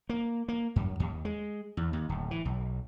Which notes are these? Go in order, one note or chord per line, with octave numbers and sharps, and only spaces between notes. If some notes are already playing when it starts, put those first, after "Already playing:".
A#3
A#3
F#2
D#2
G#3
E2
D#2
D1
E3
B1